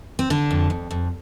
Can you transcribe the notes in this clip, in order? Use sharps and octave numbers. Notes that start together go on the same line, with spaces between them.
C4
D3 D4
F2
F2
F2